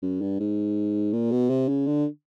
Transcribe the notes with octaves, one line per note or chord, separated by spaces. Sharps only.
F#2
G2
G#2
A#2
B2
C3
C#3
D3